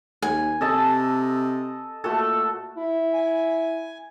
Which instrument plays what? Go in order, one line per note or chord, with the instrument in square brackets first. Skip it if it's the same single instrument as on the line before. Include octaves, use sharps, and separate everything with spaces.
[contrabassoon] D#2 [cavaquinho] G#5
[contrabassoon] C3 [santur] A4 D#5 A5
[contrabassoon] A#2 [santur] A3 F#4 A4
[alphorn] E4
[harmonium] G#5